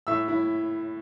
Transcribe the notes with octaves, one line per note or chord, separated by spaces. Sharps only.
A2 E5 E6
E4